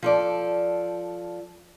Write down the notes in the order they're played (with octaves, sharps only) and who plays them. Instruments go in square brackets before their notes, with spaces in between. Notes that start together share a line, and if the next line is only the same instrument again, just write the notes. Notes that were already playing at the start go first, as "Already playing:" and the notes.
[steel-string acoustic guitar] F3 A4 D5